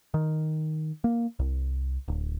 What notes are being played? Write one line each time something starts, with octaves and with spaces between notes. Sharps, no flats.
D#3
A#3
C2
D1